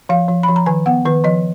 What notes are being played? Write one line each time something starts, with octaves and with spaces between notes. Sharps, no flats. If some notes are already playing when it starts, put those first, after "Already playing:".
F3 F5
F3
F3 B5
A#5
D#3 G#5
B3 F#5
D#3 B4
F3 D#5